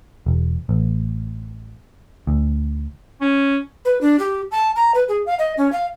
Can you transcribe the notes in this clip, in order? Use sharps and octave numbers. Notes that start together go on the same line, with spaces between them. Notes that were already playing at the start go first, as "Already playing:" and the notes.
E1
A1
D2
C#4
B4
D4
G4
A5
A#5
B4
G#4
F5
D#5
C#4
F5